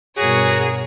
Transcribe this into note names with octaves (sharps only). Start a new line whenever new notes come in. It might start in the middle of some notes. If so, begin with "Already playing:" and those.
G2 B2 F#4 G#4 A#4 C#5